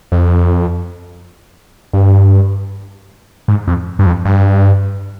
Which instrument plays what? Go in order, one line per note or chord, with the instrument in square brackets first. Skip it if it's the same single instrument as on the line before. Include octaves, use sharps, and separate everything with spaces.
[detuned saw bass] F2
G2
G#2
F2
G2
F2
G2